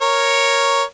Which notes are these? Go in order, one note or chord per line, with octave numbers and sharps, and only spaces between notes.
A#4 C#5